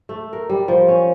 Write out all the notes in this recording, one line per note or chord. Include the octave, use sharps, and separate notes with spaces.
A3
A#4
G3
F3
C#4